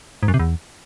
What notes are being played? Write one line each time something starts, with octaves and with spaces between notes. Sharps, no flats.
G#2
F#2
C3
E2